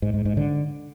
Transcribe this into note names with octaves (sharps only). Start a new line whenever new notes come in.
G#2
G#2
G#2
D3